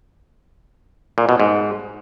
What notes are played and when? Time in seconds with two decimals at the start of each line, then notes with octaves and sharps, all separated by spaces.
1.18 A#2
1.29 B2
1.40 G#2